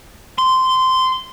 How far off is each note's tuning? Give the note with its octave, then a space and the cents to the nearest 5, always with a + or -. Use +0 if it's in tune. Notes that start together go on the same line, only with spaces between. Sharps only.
C6 -15